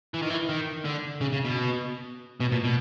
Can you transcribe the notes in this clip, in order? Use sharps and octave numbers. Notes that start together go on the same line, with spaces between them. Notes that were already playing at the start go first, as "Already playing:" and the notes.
E3
D#3
E3
D#3
D3
C#3
C#3
B2
B2
A#2
B2